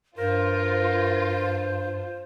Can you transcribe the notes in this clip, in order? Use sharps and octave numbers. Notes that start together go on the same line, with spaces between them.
G2 F4 A#4 C5